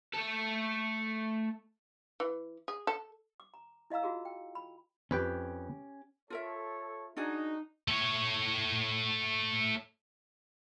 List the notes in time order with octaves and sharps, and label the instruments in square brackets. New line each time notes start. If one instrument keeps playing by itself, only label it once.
[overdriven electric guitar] A3 A4
[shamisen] E3
G#4
A4
[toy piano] D6
A#5
E4 D#5 F5 A#5 E6
F4 F#4 G#4 A#4
G5
B5
[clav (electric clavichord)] F2 B4 G5 [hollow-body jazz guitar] C#4 G4
[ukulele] F4 A#4 E5 [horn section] A4 C#5
[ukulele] D4 F#4 G#4 [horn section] D#4
[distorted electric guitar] A3 C#5